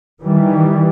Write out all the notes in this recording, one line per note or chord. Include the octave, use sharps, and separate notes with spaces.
D#3 E3 G3